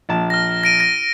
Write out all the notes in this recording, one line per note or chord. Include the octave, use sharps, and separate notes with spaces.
A#1 A5
F6 A#6
A#6 D7 D#7
A#6 D#7